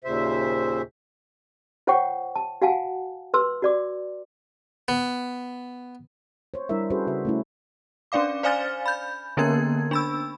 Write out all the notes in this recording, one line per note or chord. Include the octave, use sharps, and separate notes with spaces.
D#2 A#2 C#3 C5 E5
F4 C5 C#5 F#5 G5 C#6
A5
F#4 F5 F#5 G#5 A5
B4 C6 E6
F#4 D5 D6
B3
C5 C#5
G3 D4 E4 A#4 E5
C#4 F#4 G#4 A4 B4 C5
C#3 F#4 E5
A3 C#4 E4
C#4 D4 D5 F5 D6
C5 D5 F5 G#5 F6 A6
B5 G6
D3 A#3 B3 C#4 A#4 G#6
D4 B5 E6